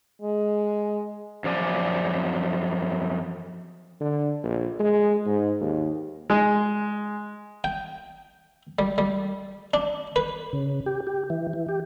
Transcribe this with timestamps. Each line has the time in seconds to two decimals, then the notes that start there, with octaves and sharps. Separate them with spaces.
0.22 G#3
1.44 F#2 F3 D5 G#5
4.00 D3
4.43 A#1
4.80 G#3
5.26 G#2
5.60 D#2
6.30 G#3
7.64 G5
8.79 G3
8.98 G3
9.74 D4
10.16 B4
10.53 C#3
10.86 G4
11.07 G4
11.30 E3
11.53 E3
11.69 G4